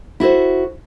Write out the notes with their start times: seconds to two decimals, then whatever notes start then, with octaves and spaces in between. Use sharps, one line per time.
0.20 E4 F#4 A4 C5